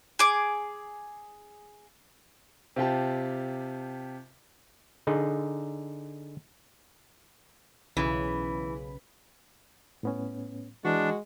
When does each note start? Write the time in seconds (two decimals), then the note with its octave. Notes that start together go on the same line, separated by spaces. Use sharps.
0.19 G#4 D6
2.76 C3 F4 G4 A5
5.07 D3 D#4 G#4
7.97 B1 C#3 E3 B5
10.03 A2 B3 C#4
10.85 E3 G#3 D4 F#4